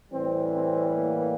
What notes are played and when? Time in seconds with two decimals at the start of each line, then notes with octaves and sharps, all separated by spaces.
0.12 A2 E3 G3 C4
0.54 C4
0.94 A#3